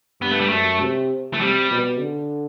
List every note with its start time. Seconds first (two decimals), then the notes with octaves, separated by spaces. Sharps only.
0.22 G2 B3
0.31 A3
0.40 G3
0.49 F#2 A3
0.81 C3
1.34 A3
1.41 C3 G3
1.71 B2
2.00 D3